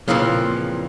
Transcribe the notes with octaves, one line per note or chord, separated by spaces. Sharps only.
F2 A#2 C#3 E3 F3